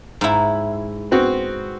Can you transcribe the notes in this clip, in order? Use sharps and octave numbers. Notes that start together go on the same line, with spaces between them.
G#2 E4
B3 C4 F#4